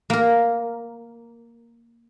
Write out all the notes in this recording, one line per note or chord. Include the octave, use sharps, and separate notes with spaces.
A#3 A#4